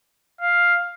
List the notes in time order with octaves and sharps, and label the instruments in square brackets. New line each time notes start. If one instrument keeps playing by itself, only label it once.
[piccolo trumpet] F5